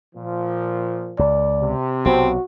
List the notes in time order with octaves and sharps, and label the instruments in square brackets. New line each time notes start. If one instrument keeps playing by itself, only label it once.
[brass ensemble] A#2 F3
[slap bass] C#2 [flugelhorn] D5
[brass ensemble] C3
[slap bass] B1 B3 [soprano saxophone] C4 [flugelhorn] F#4